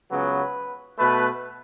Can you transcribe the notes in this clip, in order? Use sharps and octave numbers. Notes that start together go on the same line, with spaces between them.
C#2 C#3 F#3 B3 B4
B2 A3 B4